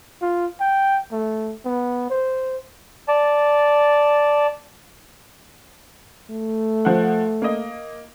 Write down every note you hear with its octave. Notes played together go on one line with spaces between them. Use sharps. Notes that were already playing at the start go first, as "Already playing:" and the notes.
F4
G5
A3
B3
C5
D5 A5
A3
F3 F#5
A#3 D#5